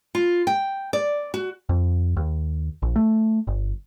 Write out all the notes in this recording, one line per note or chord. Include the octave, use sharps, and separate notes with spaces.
F4
G5
D5
F#4
F2
D#2
A#1
A3
G1